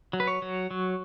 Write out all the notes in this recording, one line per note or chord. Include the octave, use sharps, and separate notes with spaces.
F#3
B4
C#5
F#3
F#3